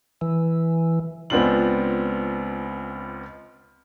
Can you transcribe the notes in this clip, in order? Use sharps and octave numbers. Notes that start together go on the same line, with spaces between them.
E3
C#2 B3 C4 D4 F4 F#7